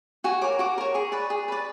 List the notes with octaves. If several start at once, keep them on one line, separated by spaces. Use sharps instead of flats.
F#4 G#5
A#4 C#5 D6
F#4 D6
A#4 C#5
G#4 C#6
B4 D5
G#4
B4 D5